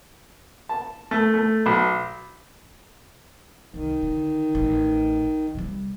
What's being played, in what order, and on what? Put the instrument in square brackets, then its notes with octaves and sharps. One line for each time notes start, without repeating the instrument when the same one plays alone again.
[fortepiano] A5
A3
A3
B1
[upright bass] C2 [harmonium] D#3
[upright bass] D3
A1
C3 G3